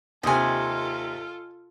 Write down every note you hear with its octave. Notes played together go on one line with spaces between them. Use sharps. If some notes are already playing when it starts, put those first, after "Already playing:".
D#2 C3 F4 A4 D#5 G#5